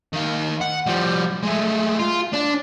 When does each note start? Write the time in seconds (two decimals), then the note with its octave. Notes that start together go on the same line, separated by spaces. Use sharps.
0.13 D#3 F5
0.61 F#5
0.86 F3 G3
1.44 G#3 A3
1.99 F4
2.33 D4